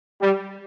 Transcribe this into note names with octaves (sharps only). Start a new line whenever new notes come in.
G3